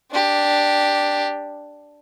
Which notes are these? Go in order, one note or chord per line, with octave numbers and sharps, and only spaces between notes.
D4 G4